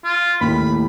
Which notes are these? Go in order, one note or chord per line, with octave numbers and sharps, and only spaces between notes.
F4
D#2 A2 B5